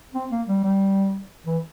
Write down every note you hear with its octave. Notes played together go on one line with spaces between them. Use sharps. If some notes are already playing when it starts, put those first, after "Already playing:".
C4
A#3
G3
G3
E3